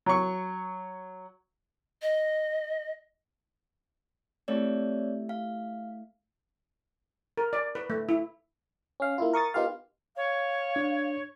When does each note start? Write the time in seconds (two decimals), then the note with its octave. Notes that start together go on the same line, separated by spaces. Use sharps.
0.06 F#3 C#6
2.01 D#5
4.48 A3 C4 E4 G4 C#5 D5
5.29 F5
7.38 A#4
7.53 D5
7.75 B4
7.90 A3
8.09 E4
9.00 C#4 F5
9.18 A#3 E4 F4
9.33 A#4 C#6 D#6 A6
9.54 B3 D#4 F4 G4 A#4 F5
10.16 C#5 F5
10.76 D4